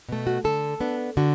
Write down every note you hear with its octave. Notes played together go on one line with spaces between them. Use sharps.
B2 A3
F#4
D3 A4
B3 D4
D3 F#4